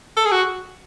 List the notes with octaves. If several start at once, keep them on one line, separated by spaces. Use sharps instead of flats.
A4
G#4
F#4